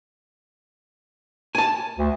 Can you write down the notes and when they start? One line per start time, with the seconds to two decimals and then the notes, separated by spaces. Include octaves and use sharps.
1.55 G#5 A5
1.99 D2